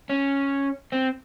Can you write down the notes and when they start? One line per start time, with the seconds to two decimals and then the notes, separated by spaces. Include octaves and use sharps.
0.09 C#4
0.92 C4